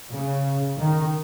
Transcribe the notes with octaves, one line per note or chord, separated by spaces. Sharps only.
C#3
D#3